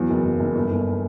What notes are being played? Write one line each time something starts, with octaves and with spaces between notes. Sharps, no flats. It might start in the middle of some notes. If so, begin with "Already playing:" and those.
Already playing: E2 F#3
F#1
F#1
F#1
G1
G1